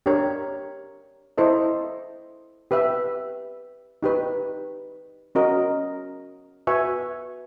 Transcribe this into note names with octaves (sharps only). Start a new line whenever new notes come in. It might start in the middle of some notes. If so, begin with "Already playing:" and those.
D4 G4 A#4 C#5
E4 A4 C5 D#5
G4 B4 E5
D#4 G4 B4
C#4 F#4 A#4 D#5
F#4 B4 E5 G#5 C#6